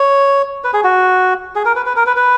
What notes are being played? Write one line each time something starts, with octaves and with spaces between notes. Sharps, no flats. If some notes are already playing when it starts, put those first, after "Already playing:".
Already playing: C#5
B4
G#4
F#4
G#4
A#4
B4
B4
A#4
B4
B4